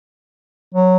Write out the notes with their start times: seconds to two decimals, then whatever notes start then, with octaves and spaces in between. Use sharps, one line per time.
0.74 F#3